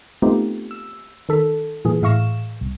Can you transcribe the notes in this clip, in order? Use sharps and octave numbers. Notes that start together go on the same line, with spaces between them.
A3 B3 C4 D#4 F4 G4
E6
D#3 A4 B6
A#2 E3 G#4
A2 E5 F5 C#6 A#6 E7
C2